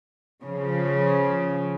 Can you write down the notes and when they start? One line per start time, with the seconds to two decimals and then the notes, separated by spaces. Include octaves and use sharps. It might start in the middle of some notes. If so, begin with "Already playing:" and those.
0.43 C#3 F3